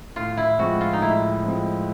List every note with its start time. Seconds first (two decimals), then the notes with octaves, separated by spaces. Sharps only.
0.16 A2 F4
0.37 E4
0.59 F3 G#3 C4 F#4
0.81 F4
0.93 D#4
1.02 A2 E4
1.44 F3 G#3 C4